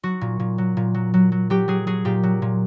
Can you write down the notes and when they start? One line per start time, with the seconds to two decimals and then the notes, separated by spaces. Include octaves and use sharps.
0.03 F#3 F#4
0.21 A#2
0.40 A#2
0.58 F#3
0.77 A#2
0.95 F#3
1.14 F#3
1.32 F#3
1.50 F#3 G4
1.68 F#3 G#4
1.87 F#3 G#4
2.05 A#2 G4
2.23 F#3
2.42 A#2